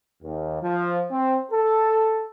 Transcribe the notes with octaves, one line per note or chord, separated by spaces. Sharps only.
D#2
F3
C4
A4